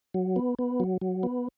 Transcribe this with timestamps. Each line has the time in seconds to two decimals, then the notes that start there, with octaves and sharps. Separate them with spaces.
0.14 F#3
0.36 B3
0.59 B3
0.80 F#3
1.02 F#3
1.23 B3